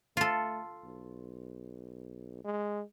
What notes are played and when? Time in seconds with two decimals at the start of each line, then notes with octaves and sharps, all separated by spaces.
0.17 A3 F4 A4
0.84 B1
2.44 G#3